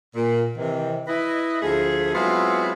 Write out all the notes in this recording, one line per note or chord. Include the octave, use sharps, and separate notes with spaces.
A#2
C3 D#3 E3
E4 B4 D#5
D2 F3 A3 G#4
F#3 G#3 B3 C4 E4 F4